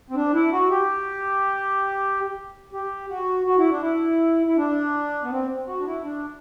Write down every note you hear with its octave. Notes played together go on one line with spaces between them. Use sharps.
C4
D4
E4
F#4
G4
G4
F#4
F#4
E4
D4
E4
E4
D4
B3
C4
F#4
D4
E4
D4